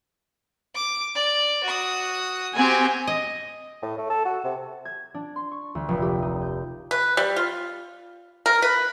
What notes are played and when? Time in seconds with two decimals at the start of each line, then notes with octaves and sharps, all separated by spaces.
0.74 D6
1.15 D5
1.64 F#4 D#6
2.55 C4 F#4 G4 G#5
3.07 D#5
3.82 A2
3.98 A3
4.10 A4
4.25 F#4
4.44 C3
4.85 G#6
5.14 D4
5.36 C6
5.52 C#6
5.75 D2
5.88 F1
6.02 G4
6.22 D#4
6.42 G6
6.91 B4
7.17 G3
7.36 F4
8.46 A#4
8.62 B4